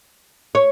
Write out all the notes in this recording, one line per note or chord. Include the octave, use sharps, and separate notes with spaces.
C#5